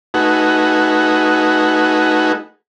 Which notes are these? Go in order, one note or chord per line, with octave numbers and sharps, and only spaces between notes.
A3 D#4 F#4 G#4 B4